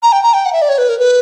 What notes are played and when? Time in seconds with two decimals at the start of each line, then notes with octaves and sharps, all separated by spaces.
0.03 A#5
0.12 G5
0.23 A#5
0.34 G5
0.46 F#5
0.53 E5
0.62 D5
0.69 C#5
0.78 B4
0.89 A#4
0.99 B4